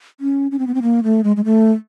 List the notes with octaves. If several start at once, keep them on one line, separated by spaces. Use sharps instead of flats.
C#4
C#4
C4
B3
C4
A#3
A3
G#3
G#3
A3